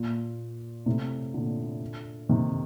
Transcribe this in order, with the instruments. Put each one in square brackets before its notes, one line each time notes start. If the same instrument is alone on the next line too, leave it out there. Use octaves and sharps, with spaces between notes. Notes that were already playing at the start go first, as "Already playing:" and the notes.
Already playing: [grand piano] A#2
A2 C3
A#2 D3
C3 D#3